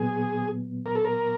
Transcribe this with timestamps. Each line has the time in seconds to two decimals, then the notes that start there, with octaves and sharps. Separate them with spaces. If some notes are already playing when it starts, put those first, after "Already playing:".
Already playing: A#2 F#3 B3 G#4
0.86 A#4
0.95 A4
1.05 A#4